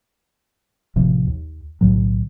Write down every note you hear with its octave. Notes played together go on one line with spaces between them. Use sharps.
A1 C3 F3
D#2
B1 A2 D3 F#3